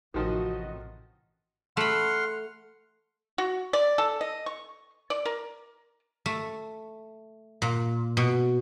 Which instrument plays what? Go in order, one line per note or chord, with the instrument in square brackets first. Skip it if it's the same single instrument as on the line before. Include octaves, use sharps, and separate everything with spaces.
[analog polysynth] A1 F#4 D#5 [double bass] A2 C3 [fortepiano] D#3 F3
[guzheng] A3 B5 [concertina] F#5 C6 F6
[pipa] F#4
D5
A4
D#5
C#6
D5
A#4
[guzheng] A3
A#2
B2